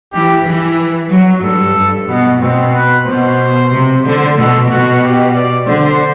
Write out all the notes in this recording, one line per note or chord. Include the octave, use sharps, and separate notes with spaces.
E3 G4
E3
F#3
G2 A4
G2
B2 B3
B2 C4
B4
B2 C5
C3
D3 C5
B2 A4
B2 F#4
G4
D5
D3 C5